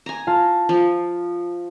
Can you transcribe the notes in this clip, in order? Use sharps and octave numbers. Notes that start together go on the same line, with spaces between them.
G#5 A#5
F4 F5 A5
F3